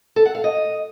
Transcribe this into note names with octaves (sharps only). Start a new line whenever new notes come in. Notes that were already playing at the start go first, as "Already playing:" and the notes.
A4
F#5
F5
D#5